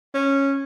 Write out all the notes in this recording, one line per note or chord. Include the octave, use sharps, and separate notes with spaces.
C#4